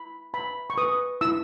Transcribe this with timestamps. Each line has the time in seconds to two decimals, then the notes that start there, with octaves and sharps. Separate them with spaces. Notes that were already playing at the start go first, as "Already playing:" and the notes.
Already playing: E4 B5
0.33 B4 B5
0.70 C#6
0.78 B4 D#6
1.21 E4 E6